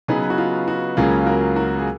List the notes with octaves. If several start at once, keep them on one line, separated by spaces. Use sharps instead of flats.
C#3 F#3 B3 D#4 G#4 B4
F#4
F4
F#4
C#2 C#3 F#3 A#3 C#4 F4 G#4
F#4 A#4
F#4 A#4
G#4